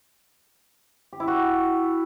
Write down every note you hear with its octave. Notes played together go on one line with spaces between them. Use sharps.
G4
E4
F#4